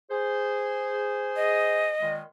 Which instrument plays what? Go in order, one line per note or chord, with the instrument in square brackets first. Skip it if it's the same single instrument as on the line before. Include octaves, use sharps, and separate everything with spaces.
[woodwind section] G#4 C5
[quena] D#5
[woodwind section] A#2 D#3 G#3